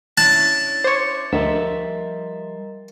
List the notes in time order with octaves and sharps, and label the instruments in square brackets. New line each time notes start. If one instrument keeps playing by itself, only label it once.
[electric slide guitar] C#4 D4 E4 [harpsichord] A5 [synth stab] F#6
[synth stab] C5 C#5 [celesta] D6 C#7
[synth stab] D2 [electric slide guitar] F3 G3 E5 [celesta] A#4 D#5 A#5